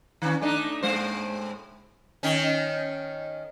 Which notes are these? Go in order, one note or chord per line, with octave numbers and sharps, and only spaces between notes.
D#3 C#4
A3 D4 D#4
A2 G#3 C5
D#3 C#4